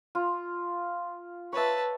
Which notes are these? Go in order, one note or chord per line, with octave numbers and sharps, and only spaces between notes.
F4
B4 C#5 E5 A5